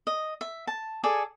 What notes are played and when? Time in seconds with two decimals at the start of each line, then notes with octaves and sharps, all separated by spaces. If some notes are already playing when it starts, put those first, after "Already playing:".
0.07 D#5
0.41 E5
0.67 A5
1.03 G#4 A4 D5 G#5